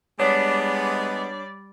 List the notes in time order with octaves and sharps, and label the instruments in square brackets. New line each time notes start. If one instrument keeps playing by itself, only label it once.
[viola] G3 D5 [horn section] G#3 B3 [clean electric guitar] D4 [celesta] C#5 B6